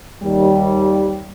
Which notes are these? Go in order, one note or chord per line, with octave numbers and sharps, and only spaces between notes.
D#2 G3